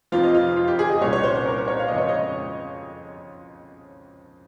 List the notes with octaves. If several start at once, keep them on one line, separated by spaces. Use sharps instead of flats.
F1 F2 C3 F3 F4
D#5
F4
F4
G4
G#4
D#5
C2 A#2 G3 C#4 C#5
C#5
C5
C5
A#4
C5
C#5
F5
F2 C#3 G#3 C4 D#5
C#5
D#5